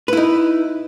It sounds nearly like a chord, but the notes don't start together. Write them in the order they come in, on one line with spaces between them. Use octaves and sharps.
B4 E4 D#4